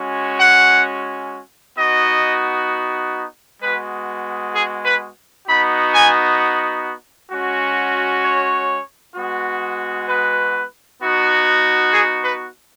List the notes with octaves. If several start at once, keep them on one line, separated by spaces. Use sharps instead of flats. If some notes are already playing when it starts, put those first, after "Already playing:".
Already playing: G#3 C#4 F#4
F#5
B3 D#4 F#4 D#5
G#3 B3 F#4 B4
G#4
B4
B3 D#4 F#4 B5
G#5
G#3 C#4 F#4
C#5
G#3 B3 F#4
B4
B3 D#4 F#4
G#4
B4